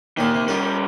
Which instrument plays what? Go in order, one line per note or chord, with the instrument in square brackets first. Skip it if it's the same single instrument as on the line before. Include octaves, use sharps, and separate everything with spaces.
[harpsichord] D#2 A#2 D#6 [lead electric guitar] D#3 A#3
[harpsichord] C3
[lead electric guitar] G3 C#4 [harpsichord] D#4 F4 A#4